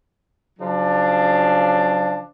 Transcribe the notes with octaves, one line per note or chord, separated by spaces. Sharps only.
C#3 F3 F#3 D4